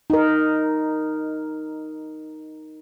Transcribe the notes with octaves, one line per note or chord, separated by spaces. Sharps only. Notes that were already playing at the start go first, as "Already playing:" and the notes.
D#4 A#4